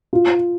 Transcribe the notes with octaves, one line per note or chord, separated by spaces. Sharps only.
F4